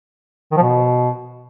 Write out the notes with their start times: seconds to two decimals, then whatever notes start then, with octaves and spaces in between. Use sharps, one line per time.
0.52 D#3
0.57 F3
0.62 B2